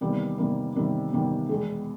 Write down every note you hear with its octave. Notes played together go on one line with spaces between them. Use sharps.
E2 C3 D#3 G3 A#3
E2 C3 D#3 G3 A#3
E2 C3 D#3 G3 A#3
E2 C3 D#3 G3 A#3
E2 B2 G#3